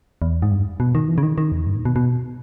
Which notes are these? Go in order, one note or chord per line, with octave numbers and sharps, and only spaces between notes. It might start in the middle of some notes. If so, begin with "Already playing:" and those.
E2
G#2
G2
B2
D#3
E3
C#3
D#3
D#3
E2
G2
A#2
B2
B2